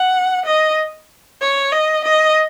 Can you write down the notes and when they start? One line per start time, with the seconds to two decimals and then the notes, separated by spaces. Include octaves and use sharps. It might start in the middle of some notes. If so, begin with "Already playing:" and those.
Already playing: F#5
0.46 D#5
1.41 C#5
1.72 D#5
2.04 D#5